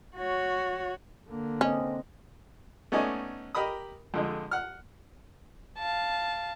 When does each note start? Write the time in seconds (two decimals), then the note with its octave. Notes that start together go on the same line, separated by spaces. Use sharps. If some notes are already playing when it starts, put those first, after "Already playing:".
0.17 F#4 C#5
1.29 D3 A#3
1.61 C4 C#4 D#5
2.92 A3 B3 C#4 D#4 D5 G#5
3.55 G4 A#4 D#5 B5 D#6
4.14 F2 D3 G#3
4.51 F#5 F6
5.79 F5 A5